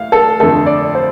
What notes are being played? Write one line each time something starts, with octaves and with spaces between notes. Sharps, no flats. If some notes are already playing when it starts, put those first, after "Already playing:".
Already playing: A2 F5
A4
F2 D3 A3 A4
D5
C5